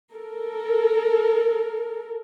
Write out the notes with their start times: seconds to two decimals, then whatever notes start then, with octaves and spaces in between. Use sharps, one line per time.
0.14 A4 A#4